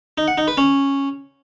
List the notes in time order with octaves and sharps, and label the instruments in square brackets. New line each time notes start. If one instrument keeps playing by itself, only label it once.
[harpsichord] D#4
F#5
D#4
B4
C#4